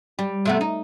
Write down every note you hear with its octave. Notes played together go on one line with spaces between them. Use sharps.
G3
C3 A3 B3
D#4